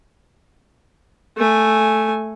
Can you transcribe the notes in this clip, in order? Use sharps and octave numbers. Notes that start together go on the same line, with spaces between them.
A3 G#5